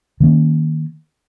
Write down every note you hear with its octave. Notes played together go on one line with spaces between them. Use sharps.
D#3 G3 A#3 C#4